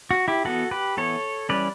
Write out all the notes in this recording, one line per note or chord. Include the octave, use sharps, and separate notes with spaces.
F#4
E4 G4
E3 B3 F#4 A4
G4 B4
E3 B3 A4 C#5
E3 G3 C#4 B4 D5